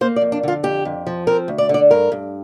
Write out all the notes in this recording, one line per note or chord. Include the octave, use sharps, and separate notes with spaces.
A#3 C5
D5
F2
D4
D3 F4
F2 G4
F2
F3
C4 A#4
D2
D5
D3 D5
G2 A#4
G2